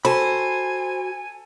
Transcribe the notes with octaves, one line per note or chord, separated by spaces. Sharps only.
F#4 A4 C5 G#5 B5